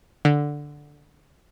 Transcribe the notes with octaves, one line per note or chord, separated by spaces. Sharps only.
D3